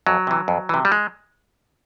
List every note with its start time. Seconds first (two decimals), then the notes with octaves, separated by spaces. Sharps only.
0.07 F2 F#3
0.27 C3 E3
0.48 F2
0.69 C3 E3
0.85 G3
0.92 G#3